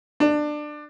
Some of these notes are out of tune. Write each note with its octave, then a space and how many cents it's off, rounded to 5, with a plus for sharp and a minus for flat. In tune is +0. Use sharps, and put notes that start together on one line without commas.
D4 +20